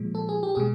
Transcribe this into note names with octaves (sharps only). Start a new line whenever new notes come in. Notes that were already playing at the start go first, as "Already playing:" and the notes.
Already playing: A#2 F3 G#3
A4
G#4
G4
B2 G#3 G#4